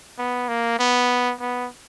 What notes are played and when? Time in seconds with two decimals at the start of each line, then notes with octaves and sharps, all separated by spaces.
0.18 B3
0.48 A#3
0.79 B3
1.40 B3